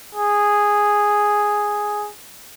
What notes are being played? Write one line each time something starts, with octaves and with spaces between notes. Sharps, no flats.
G#4